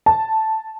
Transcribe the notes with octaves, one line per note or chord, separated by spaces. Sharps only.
A5